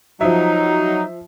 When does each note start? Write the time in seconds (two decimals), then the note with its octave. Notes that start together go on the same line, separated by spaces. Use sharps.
0.21 F3 F#3 D#4 E5